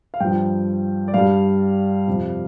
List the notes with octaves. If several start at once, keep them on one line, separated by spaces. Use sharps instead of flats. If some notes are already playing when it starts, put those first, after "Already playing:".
F5
G2 F3 G5
D5
G2 G3 F5
F2 C3 F3